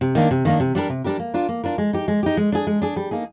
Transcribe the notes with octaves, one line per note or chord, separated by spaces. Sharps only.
C3
D#3 A#3 D4
C3
D#3 A#3 D4
C3
G3 D4 G4 A#4
C3
G3 D4 G4 A#4
A#3
D4 F4 A#4
A#3
D4 F4 A#4
G#3
D#4 G4
G#3
D#4 G4
G#3
D4 G#4
G#3
D4 G#4
G3
A#3 D#4 G#4